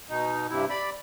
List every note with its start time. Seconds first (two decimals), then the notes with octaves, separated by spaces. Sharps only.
0.09 B2 D#4
0.50 G2 C3 E4
0.70 D5 B5